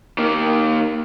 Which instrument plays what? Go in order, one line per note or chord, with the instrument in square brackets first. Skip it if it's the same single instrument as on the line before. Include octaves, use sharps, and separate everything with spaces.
[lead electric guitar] D#3 A#3